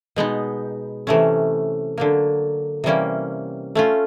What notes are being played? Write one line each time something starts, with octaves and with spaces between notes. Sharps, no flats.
B2 G#3 B3 D#4
C3 E3 A3 C#4
D3 F#3 A#3
C3 E3 G3 A#3 C#4
A3 C#4 F4